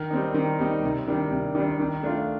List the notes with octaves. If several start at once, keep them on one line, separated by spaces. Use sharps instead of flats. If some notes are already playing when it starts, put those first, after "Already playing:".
Already playing: D#3
G3 C4 D#4
D#3
G3 C4 D#4
C3
D#3 G3 D4
C3
D#3 G3 D4
D#3
A3 D4 F4